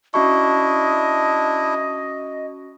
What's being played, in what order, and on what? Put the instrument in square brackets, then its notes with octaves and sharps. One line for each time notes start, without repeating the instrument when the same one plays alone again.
[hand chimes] C#4 F#4 C#6 [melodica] D4 E4 [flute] D#5